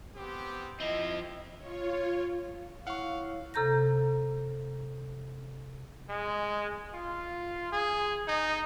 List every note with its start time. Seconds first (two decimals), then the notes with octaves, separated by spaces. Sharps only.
0.16 B3 C4 G4
0.80 F3 C4 E4 D#5
1.57 F4 C#5
2.43 F5
2.87 E4 C#5 F5 F#5 C#6
3.54 C3 A4 A#5 G6 A#6
6.09 G#3
6.94 F4
7.72 G#4
8.27 D#4